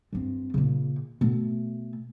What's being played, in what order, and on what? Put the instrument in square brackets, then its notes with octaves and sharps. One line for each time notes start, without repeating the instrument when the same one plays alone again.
[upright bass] G2 C4
A#2 C#3
B2 A3